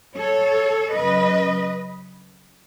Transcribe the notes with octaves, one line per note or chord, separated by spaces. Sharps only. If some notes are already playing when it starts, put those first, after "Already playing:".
A4 C#5
F#2 C#3 F#3 B4 D#5